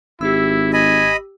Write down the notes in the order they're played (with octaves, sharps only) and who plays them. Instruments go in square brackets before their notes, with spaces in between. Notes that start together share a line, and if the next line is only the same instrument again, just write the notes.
[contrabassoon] G#1 [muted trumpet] E4 [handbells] G4 E6
[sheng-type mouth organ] D#5 B5 [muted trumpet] G#5